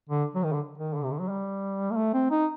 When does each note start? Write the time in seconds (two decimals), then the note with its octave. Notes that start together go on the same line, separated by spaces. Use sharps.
0.09 D3
0.35 F#3
0.44 D#3
0.52 D3
0.78 D#3
0.95 D3
1.04 C3
1.12 D3
1.20 F#3
1.29 G3
1.91 A#3
1.97 A3
2.14 C4
2.31 D#4